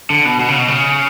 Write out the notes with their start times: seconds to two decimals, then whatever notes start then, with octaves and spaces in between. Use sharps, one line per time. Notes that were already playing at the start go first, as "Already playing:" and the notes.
0.10 D3
0.25 B2
0.40 B2
0.48 C#3
0.58 B2
0.68 C#3